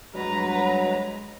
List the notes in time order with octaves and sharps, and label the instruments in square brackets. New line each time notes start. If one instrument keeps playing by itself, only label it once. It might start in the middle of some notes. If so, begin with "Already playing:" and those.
[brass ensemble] G2 F#3 [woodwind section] G#3 [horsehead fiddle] B4 A#5